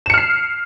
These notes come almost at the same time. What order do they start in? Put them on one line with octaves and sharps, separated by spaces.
E7 C#7 F6 C7